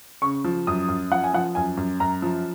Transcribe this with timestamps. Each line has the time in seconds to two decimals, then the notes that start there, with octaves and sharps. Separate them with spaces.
0.22 C#3 C#6
0.45 F3
0.67 F#2 D#6
0.88 F#2
1.11 F3 F#5
1.24 G#5
1.34 F3 F#5
1.55 F#2 G#5
1.77 F#2
2.00 F#2 A#5
2.22 F3